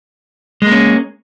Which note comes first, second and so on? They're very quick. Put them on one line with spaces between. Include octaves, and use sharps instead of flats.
G#3 A#3 C#4